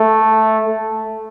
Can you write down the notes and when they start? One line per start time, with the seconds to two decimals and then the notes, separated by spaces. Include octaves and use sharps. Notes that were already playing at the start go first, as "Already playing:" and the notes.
Already playing: A3
0.66 A3